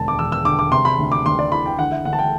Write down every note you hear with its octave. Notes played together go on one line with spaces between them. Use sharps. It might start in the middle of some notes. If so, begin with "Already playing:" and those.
Already playing: E1 D2 A5
D6
E1 E6
E6
D3 D6
D6
C3 C6
B5
D2
D6
D2 C6
D5
E3 B5
G5
D3 F#5
E5
D2 F#5
A5
G5